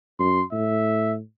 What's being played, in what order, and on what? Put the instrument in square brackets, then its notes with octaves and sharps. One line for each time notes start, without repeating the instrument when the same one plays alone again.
[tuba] F#2 [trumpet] C6
[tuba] A2 [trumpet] E5